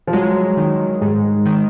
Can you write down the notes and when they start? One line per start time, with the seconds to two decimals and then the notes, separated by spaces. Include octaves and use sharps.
0.07 F3
0.13 F#3 G#3
0.57 D#3
1.01 G#2 G#3
1.46 D#3